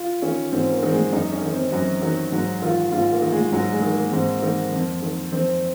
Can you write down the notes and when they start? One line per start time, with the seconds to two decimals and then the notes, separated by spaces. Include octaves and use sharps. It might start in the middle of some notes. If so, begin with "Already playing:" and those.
Already playing: F4
0.22 D#3 C#4
0.52 G#2 C4
0.72 A#3
0.83 D#3
0.93 G#3
1.12 F#2 D#4
1.32 C#4
1.42 D#3
1.52 C4
1.72 F#2 F#3
2.02 D#3 F#3
2.32 G#2 F#3
2.62 D#3 F4
2.92 G#2 F4
3.12 A#3
3.22 D#3
3.33 G#3
3.52 G#2 F#3
3.73 G#3
3.82 D#3
3.93 A#3
4.12 G#2 C4
4.42 D#3 A#3
4.72 F2
5.02 D#3
5.32 F2 C4